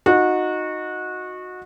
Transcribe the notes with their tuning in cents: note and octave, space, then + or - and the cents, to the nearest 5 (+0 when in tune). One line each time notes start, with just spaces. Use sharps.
D#4 +0 F#4 -20